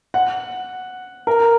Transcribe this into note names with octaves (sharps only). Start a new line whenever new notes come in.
F#5
A#4